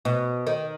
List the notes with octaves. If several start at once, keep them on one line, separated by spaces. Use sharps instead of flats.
B2
D#3